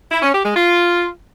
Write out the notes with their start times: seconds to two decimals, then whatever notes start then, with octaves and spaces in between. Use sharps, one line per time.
0.11 E4
0.22 C#4
0.34 G4
0.45 G#3
0.56 F4